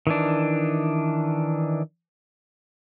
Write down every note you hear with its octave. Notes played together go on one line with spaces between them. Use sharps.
D#3 E3 D4